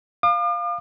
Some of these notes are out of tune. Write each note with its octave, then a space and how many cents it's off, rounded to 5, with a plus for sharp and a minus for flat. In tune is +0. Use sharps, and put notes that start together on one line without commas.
F5 +0 D6 +45